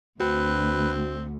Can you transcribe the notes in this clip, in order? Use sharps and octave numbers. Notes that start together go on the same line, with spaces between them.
D2 C4 F#4 B4